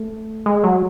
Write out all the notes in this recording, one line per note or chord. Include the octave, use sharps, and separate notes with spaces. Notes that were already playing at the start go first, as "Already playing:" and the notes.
Already playing: A3
G#3
F#3